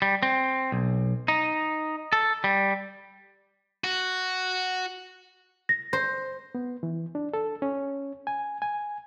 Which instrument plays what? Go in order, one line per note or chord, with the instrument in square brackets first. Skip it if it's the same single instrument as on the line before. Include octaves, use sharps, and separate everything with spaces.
[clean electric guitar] G3
C4
B1
D#4
A4
G3
[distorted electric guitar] F#4
[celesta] A#6
[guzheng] C5
[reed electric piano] B3
E3
D4
A4
C#4
G#5
G#5